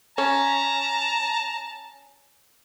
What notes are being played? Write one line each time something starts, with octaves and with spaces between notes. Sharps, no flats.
C#4 A5 A#5